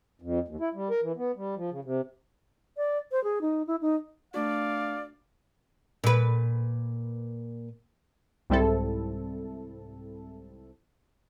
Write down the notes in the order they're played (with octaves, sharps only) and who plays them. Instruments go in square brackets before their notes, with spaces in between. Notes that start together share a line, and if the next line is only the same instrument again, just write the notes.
[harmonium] F2
D#2
E4
G3
A#4
E3
B3
G3
F3
C#3
C3
[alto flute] D5
C5
G#4
D#4
E4
D#4
[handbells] A3 D4 F#4 [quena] D5 [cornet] F5
[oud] A#2 B4
[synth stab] C2 G#2 G3 C4 E4 A4